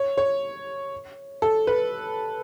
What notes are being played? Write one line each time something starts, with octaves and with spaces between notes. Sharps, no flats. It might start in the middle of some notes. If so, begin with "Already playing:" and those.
Already playing: C#5
C#5
A4
B4